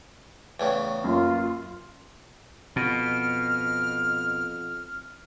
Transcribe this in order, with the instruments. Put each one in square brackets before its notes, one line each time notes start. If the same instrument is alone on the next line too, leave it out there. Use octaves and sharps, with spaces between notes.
[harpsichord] E2 A2 C#3
[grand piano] F#2 A#3 [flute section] F4
[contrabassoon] F2 [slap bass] B2 [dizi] F6